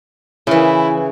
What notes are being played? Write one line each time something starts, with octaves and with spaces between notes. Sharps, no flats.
C#3 E3 E4